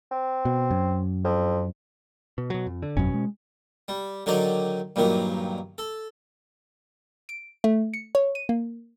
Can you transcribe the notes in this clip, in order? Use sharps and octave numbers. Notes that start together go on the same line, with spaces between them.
C4
B2
F#2
F2
B2
B2 F#3
F2
D3
G1 F2 B2 F#3 C#4
G#3
G3
D3 D#3 F#3 D#4 D5
G2 A#2 D#3 F#3
A4
D7
A3
C#7
C#5
D#7
A#3